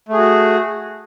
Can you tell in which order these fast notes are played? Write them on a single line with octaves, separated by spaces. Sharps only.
A3 G#4 F#4